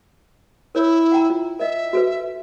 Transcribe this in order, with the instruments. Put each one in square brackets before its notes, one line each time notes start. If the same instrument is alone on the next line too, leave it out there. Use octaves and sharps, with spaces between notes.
[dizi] E4 [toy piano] A#4 C#5
[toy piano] F#5 G5 A#5
F4
[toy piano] A#4 D#5 [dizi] E5
[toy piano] F#4 A4 B4